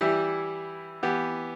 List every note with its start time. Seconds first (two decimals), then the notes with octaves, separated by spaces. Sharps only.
0.01 E3 G3 E4 G4
1.03 E3 B3 G4